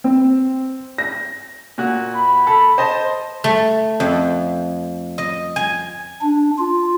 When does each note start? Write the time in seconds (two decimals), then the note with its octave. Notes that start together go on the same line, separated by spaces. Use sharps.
0.04 C4
0.98 A#6
1.78 A#2 F#4
2.15 B5
2.47 A4
2.78 C5 D#5 A5
3.44 A3
4.00 F2
5.18 D#5
5.56 G#5
6.22 D4
6.59 F4